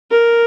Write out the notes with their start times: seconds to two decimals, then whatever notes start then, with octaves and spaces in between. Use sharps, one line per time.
0.11 A#4